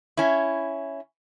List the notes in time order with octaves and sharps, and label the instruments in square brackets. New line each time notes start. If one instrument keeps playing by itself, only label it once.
[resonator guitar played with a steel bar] C#4 E4